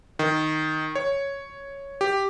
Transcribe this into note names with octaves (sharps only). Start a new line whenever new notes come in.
D#3
C#5
G4